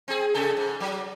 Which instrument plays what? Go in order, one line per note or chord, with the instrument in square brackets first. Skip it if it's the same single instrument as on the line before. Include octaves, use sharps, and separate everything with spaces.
[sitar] C4 G#4
C3 G#4 A4
G#2
F#3